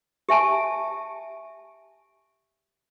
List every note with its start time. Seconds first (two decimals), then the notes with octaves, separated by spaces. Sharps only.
0.29 G4 E5 G#5 A5